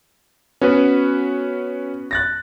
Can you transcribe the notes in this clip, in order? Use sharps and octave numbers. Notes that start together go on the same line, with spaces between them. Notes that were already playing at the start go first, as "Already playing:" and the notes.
B3 C#4 F#4 B4
F#6 A6 A#6